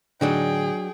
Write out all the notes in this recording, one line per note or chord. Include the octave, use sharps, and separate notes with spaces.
A2 D3 F#3 D4 D#4 G#4 G5